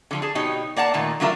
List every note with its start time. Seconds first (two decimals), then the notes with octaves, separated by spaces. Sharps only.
0.11 D3 F3 G3
0.22 G#4 A5
0.35 B2 D#4 G4 C#5
0.76 A#3 D5 F#5 A5
0.94 A#2 D#3 A3 A#3
1.20 F#3 A3 D4 F4 A#4 E5